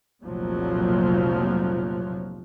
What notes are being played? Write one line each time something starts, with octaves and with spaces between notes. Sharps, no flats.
F1 C2 A#2 F3 F#3